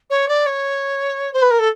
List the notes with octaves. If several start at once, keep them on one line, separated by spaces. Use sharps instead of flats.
C#5
D5
C#5
C5
B4
A#4
A4